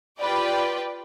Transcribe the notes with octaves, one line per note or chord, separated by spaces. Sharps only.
F4 G4 B4 D5 G5